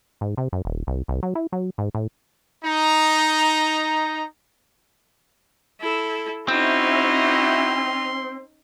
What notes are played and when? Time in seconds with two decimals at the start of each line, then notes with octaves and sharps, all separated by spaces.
0.21 G#2
0.37 C3
0.53 F#2
0.65 D#1
0.87 C2
1.08 C2
1.23 F#3
1.35 E4
1.52 F#3
1.78 G#2
1.95 A2
2.64 D#4 A#5
5.81 E4 A4
6.48 C4 C#4 D#4 E4 F#4 E5 C6